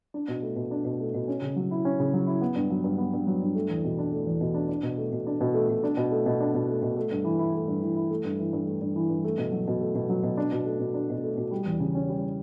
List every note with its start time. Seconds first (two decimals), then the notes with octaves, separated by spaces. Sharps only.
0.14 D4
0.28 B2
0.43 A3
0.56 B2
0.71 D4
0.85 B2
1.00 A3
1.14 B2
1.28 C#4
1.42 C#3
1.56 F#3
1.71 E4
1.85 C#4
2.00 C#3
2.14 F#3
2.27 E4
2.41 B3
2.55 G2
2.70 F#3
2.84 G2
2.98 B3
3.13 G2
3.27 F#3
3.42 G2
3.55 A3
3.69 E2
3.84 B2
3.99 D4
4.12 A3
4.27 E2
4.41 B2
4.54 D4
4.69 D4
4.83 B2
4.98 A3
5.12 B2
5.27 D4
5.41 B2
5.54 A3
5.69 B2
5.84 D4
5.97 B2
6.12 A3
6.26 B2
6.40 D4
6.54 B2
6.69 A3
6.82 B2
6.97 A3
7.11 G2
7.25 E3
7.39 E4
7.54 A3
7.68 G2
7.82 E3
7.96 E4
8.11 A3
8.25 G2
8.39 E3
8.53 G2
8.67 A3
8.81 G2
8.96 E3
9.10 G2
9.25 A3
9.38 B2
9.52 F#3
9.67 B2
9.80 A3
9.95 B2
10.09 F#3
10.23 B2
10.37 D4
10.52 B2
10.66 A3
10.80 B2
10.94 D4
11.10 B2
11.24 A3
11.37 B2
11.51 G3
11.66 E2
11.80 C#3
11.95 C#4
12.08 G3